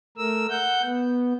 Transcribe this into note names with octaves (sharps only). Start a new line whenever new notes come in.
A3 A#4 E6
F#5 G6
B3